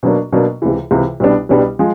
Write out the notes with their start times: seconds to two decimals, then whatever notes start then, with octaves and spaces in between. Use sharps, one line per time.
0.03 B2 F#3 A#3 D4
0.32 B2 F#3 A#3 D4
0.62 C#2 C3 E3
0.91 C#2 C3 E3
1.20 C2 B2 G3 B3 D4
1.49 C2 B2 G3 B3 D4
1.79 F3 G#3